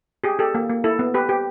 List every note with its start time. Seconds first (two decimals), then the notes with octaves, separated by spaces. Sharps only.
0.24 G4 G#4
0.39 G4 A4
0.55 A#3
0.69 A#3
0.84 E4 A4
0.99 B3
1.14 G4 B4
1.29 G4